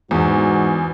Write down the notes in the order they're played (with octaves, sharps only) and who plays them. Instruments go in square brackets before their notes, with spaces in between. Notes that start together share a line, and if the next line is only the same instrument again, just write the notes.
[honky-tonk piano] E2 [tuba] G#2 [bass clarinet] F#4